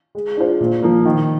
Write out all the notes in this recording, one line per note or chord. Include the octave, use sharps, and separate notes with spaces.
G#3
D4 F4 C5
A#2
F3 A#3
D#3